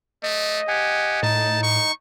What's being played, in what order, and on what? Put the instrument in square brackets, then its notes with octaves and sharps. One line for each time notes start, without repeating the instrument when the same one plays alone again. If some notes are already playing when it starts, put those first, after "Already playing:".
[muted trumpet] A3 [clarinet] D#5
[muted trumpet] G4 [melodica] F#5 G#5
[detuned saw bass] A2 [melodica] D#4 [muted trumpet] A5
[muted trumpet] C#6